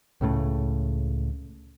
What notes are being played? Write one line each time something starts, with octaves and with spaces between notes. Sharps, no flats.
C#2 A2 C#3 A3